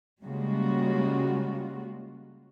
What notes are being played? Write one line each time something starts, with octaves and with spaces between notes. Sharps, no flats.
C#3 G3 G#3 A#3 F4 F#4